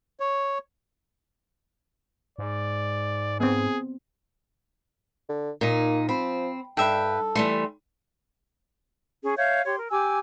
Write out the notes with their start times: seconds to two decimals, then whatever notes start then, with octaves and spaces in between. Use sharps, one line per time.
0.20 C#5
2.39 G#2 D5
3.40 B3 C4 G#4
5.29 D3
5.61 A#2 A#3 D#4
6.09 F3 C4 B5
6.77 G2 A4 B4 E5 G5
7.35 E3 G3 A3 C6
9.24 C#4 G#4
9.37 C#5 E5 F5 G6
9.65 G4 C#5 C6
9.78 A#4
9.91 G4 G#5 D6 E6